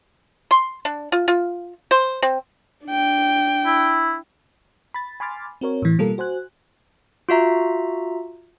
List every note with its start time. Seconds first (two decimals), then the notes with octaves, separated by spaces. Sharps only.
0.51 C6
0.85 D4
1.12 F4
1.28 F4
1.91 C5
2.22 C4
2.87 D4 G5
3.66 E4
4.94 B5 A6
5.20 G#5 B5 C6 D6 F6 A6
5.61 C4 F#4 A#4 C#5
5.82 A2 E3
5.99 B2 G3 A#3 F4 A4 A#4
6.18 F#4 C5 G#5 F#6
7.29 F4 F#4 E5 A#5